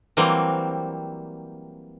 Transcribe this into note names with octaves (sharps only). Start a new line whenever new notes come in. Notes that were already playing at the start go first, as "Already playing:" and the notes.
E3 F#3 G3 A#3 C4